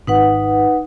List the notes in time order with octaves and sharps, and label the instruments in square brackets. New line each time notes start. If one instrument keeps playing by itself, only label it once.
[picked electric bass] G#1 [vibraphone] D#4 B4 F#5